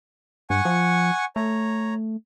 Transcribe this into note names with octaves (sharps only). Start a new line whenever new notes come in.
G2 F#5 G#5 C#6
F3
A3 C#5 A#5